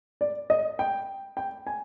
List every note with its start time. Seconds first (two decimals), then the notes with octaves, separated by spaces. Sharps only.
0.21 D5
0.50 D#5
0.79 G5
1.37 G5
1.67 G#5